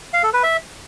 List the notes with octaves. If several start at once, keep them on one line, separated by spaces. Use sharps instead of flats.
F5
A4
B4
E5